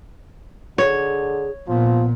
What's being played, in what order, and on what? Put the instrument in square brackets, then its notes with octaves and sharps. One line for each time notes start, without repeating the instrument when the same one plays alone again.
[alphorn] D3 [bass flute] G#4 [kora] C#5
[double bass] A#2 [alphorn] F3 [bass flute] B3